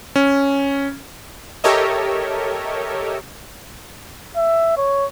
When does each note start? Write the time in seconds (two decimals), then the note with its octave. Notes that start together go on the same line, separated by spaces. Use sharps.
0.16 C#4
1.64 G4 A4 A#4 C#5 D#5 E5
4.36 E5
4.77 C#5